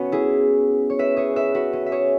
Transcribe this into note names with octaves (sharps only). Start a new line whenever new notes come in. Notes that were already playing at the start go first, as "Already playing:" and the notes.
Already playing: B3 C#4 F#4
E4 G#4
C#5
B4 E5
G#4 C#5
B4 E5
F#4 B4
C#4
E5
G#4 C#5